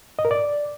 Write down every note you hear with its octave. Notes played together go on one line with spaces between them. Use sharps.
D#5
A#4
D5